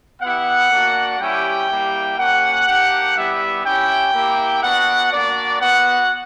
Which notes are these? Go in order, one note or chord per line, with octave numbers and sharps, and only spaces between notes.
B3 E4 G4 F#5
A#3 D4 F#4
G3 C#4 E4 G4 G5
G3 A#3 E4
A#3 C#4 G4 F#5
A#3 D4 G4
G3 B3 E4 G4 E5
C#4 E4 G4 G5
A#3 E4 G4
B3 D4 F#4 F#5
A#3 D4 F#4 D5
B3 F#4 F#5